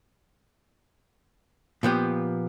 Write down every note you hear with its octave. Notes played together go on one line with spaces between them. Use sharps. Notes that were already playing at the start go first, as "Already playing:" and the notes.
A#2 F3 B3 G4